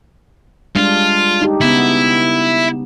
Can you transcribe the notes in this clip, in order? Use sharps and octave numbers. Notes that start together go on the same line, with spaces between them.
G3 G#3 D4 F4
D#4 G4
C#3 B3 E4